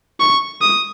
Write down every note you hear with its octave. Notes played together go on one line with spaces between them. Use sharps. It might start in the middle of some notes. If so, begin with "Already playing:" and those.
C#6
D#6